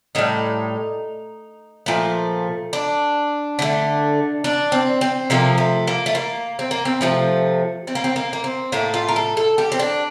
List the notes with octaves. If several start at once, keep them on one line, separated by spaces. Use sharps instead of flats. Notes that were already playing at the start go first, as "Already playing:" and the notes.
A2 G3 D#4
A#2 F3 A3
D4
D3 A3
D4
C4
C4
C3 F3 A3 A#3
A3
A#3
A3
A#3
C4
A#3
C4
C3 F3 A3
C4
A#3
C4
A#3
A#3
C4
A2 A3 A#3
F4
A#4
A4
A4
G4
C4
D4